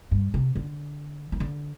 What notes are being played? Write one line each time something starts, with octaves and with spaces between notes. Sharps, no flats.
G2
C3
D3
D#3
D3